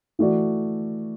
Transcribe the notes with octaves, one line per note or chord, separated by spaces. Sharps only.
E3 A3 F#4 D5